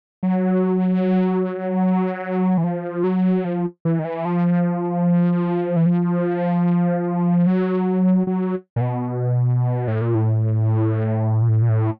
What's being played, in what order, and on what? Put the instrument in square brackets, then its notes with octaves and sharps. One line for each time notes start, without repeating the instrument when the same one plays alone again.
[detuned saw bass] F#3
E3
F3
F#3
F3
E3
D#3
E3
F3
E3
F3
F#3
F#3
A#2
B2
A2
A#2
A2
A#2
A2
A#2
A2